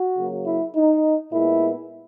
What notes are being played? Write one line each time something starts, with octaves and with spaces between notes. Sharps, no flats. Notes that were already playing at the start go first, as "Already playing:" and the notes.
Already playing: F#4
C#3 F#3 A#3
E4
D#4
A#2 G#3 B3 E4